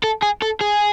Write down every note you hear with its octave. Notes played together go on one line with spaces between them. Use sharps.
A4
G#4
A4
G#4